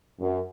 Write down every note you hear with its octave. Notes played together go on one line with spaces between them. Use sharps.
F#2